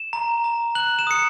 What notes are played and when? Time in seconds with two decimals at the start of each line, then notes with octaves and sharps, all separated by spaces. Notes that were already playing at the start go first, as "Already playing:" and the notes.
Already playing: E7
0.13 A#5
0.44 A#5
0.75 F#6 F#7
0.99 E7
1.07 D#6 C#7